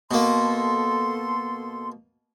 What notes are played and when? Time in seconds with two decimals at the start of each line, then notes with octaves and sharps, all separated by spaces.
0.11 B2 A#3 A4 C6